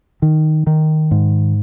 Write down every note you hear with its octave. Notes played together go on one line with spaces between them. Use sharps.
D#3
D#3
G#2